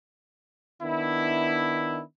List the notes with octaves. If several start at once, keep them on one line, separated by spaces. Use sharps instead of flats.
D#3 B3 D4 E4